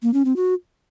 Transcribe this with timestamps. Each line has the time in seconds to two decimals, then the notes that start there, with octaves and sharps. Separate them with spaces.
0.03 A#3
0.14 C#4
0.25 C4
0.36 F#4